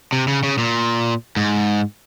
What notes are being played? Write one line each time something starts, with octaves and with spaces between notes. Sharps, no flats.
C3
C#3
C#3
A#2
G#2